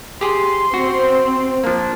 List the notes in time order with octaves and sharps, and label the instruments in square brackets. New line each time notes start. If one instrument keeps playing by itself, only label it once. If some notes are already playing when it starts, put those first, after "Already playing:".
[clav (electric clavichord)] G4 G#4 [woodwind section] C6
[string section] C4 [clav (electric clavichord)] F#4
[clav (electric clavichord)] F3 A#3 [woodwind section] D4